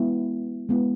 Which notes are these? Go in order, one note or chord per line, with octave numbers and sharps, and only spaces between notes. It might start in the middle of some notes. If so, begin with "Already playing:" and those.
Already playing: G#3 B3 E4
G#3 B3 E4